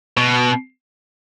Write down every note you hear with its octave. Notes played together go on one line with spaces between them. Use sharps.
B2